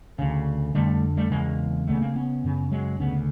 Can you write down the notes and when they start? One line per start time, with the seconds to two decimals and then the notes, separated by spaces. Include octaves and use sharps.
0.19 D2 C#3
0.75 F2 D3 G3 A3
1.17 G3 A3
1.31 E2 C#3 G#3 A#3
1.87 D2 C#3 A3 B3
2.01 A#3 C4
2.16 B3 C#4
2.44 F#2 C#3
2.71 F#3 G#3
3.00 D2 C#3 B3 C#4